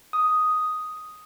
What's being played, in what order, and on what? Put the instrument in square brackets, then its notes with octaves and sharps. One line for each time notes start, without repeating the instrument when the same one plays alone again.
[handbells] D#6